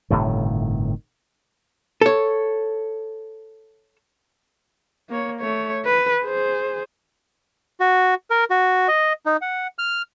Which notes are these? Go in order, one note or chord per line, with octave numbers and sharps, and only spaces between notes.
G1 A2 C3 D#3
A4 C#5
A#3 C#5
A3 C#5
B4
G#4 C5
F#4
A#4
F#4
D#5
D#4
F#5
F6